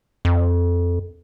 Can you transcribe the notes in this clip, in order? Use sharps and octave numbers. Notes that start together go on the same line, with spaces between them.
F2